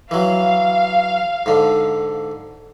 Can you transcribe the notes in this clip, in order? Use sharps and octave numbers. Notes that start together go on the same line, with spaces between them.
E3 F#3 F5
G#2 D3